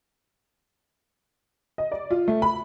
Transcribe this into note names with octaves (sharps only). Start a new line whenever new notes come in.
D#5
D5
F4
A3
B5